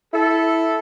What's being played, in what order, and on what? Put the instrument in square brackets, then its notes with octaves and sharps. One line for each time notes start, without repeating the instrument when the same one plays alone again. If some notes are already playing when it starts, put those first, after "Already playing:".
[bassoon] E4 [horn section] A4